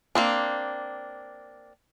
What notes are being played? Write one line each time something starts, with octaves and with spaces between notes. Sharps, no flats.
A#3 C4 D4